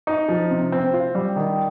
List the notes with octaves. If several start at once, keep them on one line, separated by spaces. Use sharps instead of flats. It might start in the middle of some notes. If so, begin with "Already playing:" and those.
D#4
F3
C3
C4
F4
G3
D#3